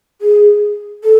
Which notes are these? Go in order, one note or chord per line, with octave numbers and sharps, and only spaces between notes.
G#4
A4